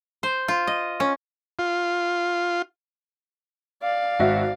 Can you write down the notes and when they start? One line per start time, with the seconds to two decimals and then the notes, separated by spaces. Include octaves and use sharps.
0.23 C5
0.48 F4
0.67 D#5
1.00 C#4
1.59 F4
3.83 D5 F5
4.19 G#1 F#4 E5